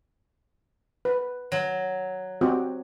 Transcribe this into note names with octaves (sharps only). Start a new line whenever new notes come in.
B4
F#3
C4 F#4 G4